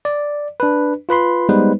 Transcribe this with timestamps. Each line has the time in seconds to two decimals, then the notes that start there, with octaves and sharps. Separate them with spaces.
0.05 D5
0.60 D4 B4
1.09 F4 B4 B5 C6
1.49 G3 G#3 B3 D#4 B4 C5